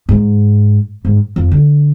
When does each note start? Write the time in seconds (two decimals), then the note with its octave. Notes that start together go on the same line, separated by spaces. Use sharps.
0.09 G#2
1.05 G#2
1.36 F2
1.52 D3